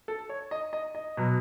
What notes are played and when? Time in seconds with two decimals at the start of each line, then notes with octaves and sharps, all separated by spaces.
0.08 A4
0.29 C#5
0.51 D#5
0.73 D#5
0.95 D#5
1.17 B2 F#3